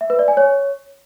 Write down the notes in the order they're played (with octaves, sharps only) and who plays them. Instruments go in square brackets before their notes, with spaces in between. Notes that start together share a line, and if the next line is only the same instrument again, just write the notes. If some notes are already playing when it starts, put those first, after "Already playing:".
[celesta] E5
B4
D5
G#5
C#5